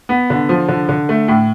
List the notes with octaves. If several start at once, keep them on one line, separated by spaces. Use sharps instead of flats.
B3
D3
F3
D3
D3
A3
A2